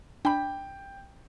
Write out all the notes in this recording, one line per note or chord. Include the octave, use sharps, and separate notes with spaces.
D4 G5 B5